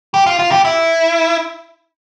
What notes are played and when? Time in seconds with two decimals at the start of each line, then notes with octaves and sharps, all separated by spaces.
0.14 G4
0.26 F4
0.39 F4
0.51 G4
0.65 E4